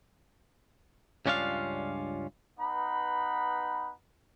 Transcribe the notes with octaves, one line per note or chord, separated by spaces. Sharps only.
C#2 G2 C#4 D4 F4 F5
B3 D#4 B4 B5